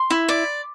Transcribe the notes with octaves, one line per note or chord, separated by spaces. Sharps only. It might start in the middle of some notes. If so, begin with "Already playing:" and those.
Already playing: C6
E4
D5